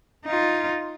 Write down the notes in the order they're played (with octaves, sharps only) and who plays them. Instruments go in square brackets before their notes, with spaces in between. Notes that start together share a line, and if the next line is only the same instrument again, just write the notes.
[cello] D#4 F4